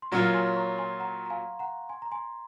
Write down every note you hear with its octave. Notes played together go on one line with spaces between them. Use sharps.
C6
A#2 F#3 C#4 F4 A#5 C#6
G#5 C6
C6
A#5 C#6
G#5 C6
F#5 A#5
A#5
F5 G#5
F#5 A#5
G#5 C6
A#5
G#5 C6